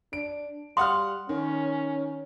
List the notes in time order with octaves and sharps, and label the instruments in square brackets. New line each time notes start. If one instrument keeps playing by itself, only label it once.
[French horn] D4 [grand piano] D7
[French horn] G3 [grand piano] F5 F#5 F6 [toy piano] C6 D#6
[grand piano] D#3 [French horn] C#4